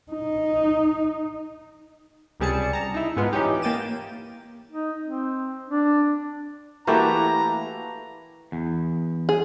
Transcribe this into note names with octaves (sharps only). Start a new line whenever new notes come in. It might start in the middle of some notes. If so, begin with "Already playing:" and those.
D#4
C#2 C3 G3 G#4 A5 C#7
A5 A#5
D#4 E4
G#2 G#3 B3 F4
E3 C#4 D#4 G4
A#3 G5 A6 D#7 E7
D#4
C4
D4
E3 A3 A#3 E4 F#4 G4 A4 A#5
E2
G#4